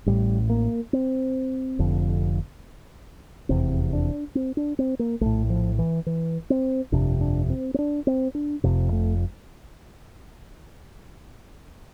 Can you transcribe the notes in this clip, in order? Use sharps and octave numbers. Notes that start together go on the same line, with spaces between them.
A1 A2 G3
A#3
C4
F1 F2 D3
F1 E2 C3 C4
D4
C4
D4
C4
A#3
A#1 A2 A3
F3
E3
E3
C4
G1 F2 C3 D4
D4
C4
C4
D4
C4
D4
F1 F2 C3
A3